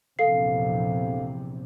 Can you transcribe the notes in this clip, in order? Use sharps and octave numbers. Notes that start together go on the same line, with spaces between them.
A#1 E2 C3 A4 F5 C7